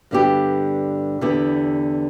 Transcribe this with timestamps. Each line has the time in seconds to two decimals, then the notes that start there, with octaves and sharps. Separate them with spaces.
0.11 G2 D3 B3 G4
1.21 E2 D3 B3 E4 G4